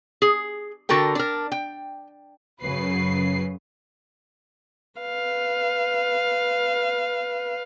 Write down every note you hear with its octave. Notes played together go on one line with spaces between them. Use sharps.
G#4
D3 F#4 A4 A#4 G5
D4 A#4
G5
F#2 C#3 F#3 B4 C7
B4 F5